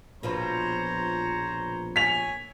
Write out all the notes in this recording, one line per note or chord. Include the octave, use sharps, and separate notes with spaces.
A#1 B2 F3 C4 C5 C#5 A#5
C#5 G#5 B6 F7